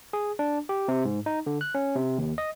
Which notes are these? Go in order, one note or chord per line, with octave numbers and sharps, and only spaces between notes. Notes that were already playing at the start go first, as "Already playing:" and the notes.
G#4
D4
G4
C3
G#2
D#4
D3
F#6
C#4
C3
D#2
D#5